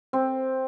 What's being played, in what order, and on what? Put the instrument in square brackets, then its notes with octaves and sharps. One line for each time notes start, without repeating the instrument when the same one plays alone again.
[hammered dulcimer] C4